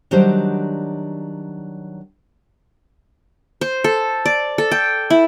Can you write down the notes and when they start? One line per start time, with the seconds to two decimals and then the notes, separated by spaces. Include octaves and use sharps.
0.11 D#3 F#3 G3 D4 F#4 C5
3.61 C5
3.84 A4
4.26 D5
4.58 A4
4.71 G5
5.10 E4